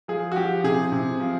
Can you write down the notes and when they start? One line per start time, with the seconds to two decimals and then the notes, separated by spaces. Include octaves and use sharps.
0.08 F3 G#4
0.32 F#4
0.36 F3 G4
0.64 C3 G#4
0.92 C3
1.20 F3